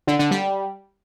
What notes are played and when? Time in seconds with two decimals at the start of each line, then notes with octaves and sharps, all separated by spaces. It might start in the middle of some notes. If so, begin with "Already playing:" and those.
0.07 D3
0.19 D3
0.31 G3